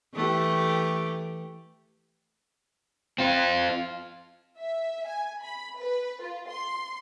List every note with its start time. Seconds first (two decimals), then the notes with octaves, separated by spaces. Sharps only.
0.14 E3 A3 G4
3.18 C4 F4
4.59 E5
5.07 G#5
5.42 B5
5.79 B4
6.21 F4
6.50 C6